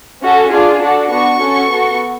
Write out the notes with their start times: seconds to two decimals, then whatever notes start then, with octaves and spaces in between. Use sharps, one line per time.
0.21 C#4 F#4 A4
0.51 D4 F4 G#4
0.81 D4 F#4 A4
1.11 B3 D4 F#4 C#6
1.41 C#4 F#4 A4
1.70 B3 F#4 A4